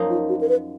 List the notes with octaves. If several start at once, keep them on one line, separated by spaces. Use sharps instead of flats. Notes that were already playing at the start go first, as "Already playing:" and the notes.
Already playing: F#2 F3 A#3 D#4
F4
F#4
A#4
B4